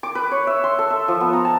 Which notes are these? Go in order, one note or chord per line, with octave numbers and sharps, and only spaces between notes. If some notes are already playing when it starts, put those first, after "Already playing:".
D6
B4
C#5
E5
C6
A4
E5
F3
B3
A#5
A5